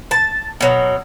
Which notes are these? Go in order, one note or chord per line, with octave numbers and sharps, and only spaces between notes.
A5
B2 F#3